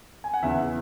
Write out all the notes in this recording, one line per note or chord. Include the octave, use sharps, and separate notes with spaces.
G#5
F#5
E2 C#3 E3 E5